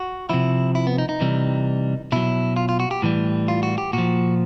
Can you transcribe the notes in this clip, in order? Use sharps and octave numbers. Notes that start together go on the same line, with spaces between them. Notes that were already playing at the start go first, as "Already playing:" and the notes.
Already playing: F#4
C3 F3 E4
E4
B3
D#4
D#4
C3 E3 G3
B2 F#3 E4
F4
F4
F#4
G4
A2 E3 G3
F4
F#4
G4
A#2 F3 F#4